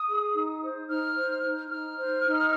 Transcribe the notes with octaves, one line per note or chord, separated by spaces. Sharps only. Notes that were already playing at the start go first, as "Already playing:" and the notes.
Already playing: D#6
G#4
D#4
C5
D#4 F6
C5
D#4
D#4 F6
C5
D#4